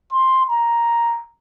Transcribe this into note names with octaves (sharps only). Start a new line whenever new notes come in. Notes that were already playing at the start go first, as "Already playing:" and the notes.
C6
A#5